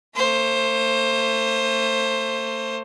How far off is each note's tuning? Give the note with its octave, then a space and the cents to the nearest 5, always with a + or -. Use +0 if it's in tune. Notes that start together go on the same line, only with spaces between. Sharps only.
A3 +40 C5 +20